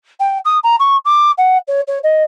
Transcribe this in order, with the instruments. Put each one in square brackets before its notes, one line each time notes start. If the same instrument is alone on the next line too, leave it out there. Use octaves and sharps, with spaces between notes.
[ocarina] G5
D#6
A#5
C#6
D6
F#5
C#5
C#5
D#5